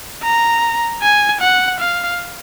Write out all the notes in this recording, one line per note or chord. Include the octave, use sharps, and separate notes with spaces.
A#5
G#5
F#5
F5